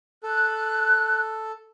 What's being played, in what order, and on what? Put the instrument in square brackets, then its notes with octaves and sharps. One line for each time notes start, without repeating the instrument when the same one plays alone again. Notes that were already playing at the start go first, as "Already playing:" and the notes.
[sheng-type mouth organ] A4 [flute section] F#6